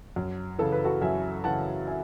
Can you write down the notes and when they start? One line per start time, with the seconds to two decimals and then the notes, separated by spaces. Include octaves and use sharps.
0.16 F#2
0.59 C#3 E3 A4
0.72 B4
0.85 F#4 A4
1.02 F#2 E5 G#5
1.44 C#3 E3 F#5 A5
1.87 E5 G#5